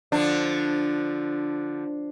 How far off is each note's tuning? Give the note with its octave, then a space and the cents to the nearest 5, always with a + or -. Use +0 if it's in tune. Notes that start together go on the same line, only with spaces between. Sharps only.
D3 +0 F3 +0 D4 +0